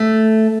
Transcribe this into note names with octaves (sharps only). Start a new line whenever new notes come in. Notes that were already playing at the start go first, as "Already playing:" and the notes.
Already playing: A3